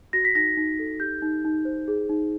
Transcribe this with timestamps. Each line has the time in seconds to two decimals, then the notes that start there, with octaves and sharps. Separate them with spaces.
0.13 F#4 A#6
0.25 B6
0.35 D#4 A#6
0.57 D#4
0.79 A4
1.00 G4 G6
1.22 D#4
1.44 D#4
1.65 C5
1.88 G#4
2.09 D#4